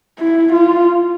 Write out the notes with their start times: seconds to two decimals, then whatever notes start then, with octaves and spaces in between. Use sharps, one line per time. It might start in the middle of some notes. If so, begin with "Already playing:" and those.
0.19 E4
0.52 F4